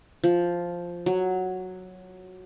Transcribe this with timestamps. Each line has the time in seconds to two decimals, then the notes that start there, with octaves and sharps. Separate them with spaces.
0.24 F3
1.06 F#3